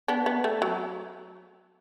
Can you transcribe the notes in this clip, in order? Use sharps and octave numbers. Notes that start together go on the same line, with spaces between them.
B3 D4
B3
A3
F#3